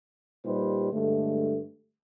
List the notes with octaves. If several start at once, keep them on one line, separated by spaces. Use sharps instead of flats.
A#2 G3 D#4 G4 B4 C5
G2 D3 G#3 A3